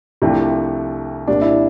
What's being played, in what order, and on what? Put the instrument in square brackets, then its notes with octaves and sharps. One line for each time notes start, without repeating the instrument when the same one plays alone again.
[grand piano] C2 C3 F3 A3 D4 [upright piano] E4
[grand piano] C2 A#2 G3 [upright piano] D4
[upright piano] E4